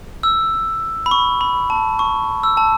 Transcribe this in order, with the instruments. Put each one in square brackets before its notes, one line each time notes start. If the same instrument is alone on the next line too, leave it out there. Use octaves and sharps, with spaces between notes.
[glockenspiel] E6
B5
C#6
B5
A5
C#6
E6
A5